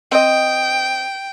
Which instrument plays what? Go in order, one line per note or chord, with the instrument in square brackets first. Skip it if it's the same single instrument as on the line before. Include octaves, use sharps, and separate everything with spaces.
[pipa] C4 D#5 [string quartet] G5